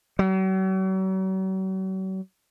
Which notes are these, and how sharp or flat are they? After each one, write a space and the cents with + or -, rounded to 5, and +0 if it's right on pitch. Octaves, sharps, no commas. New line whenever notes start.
F#3 +45